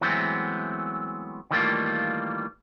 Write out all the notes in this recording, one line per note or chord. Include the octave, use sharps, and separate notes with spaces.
E3 F#3 G#3 A3 B3 C4
D#3 E3 G3 A3 A#3 F4